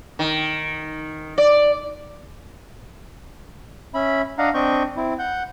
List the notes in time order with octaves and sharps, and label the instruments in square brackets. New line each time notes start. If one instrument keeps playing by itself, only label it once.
[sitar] D#3
D5
[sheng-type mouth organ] C#4 E5 B5
D4 D#5 F5 F#5 A#5
C4 D4 D#5 C#6 G6
C4 E4
F#5 G6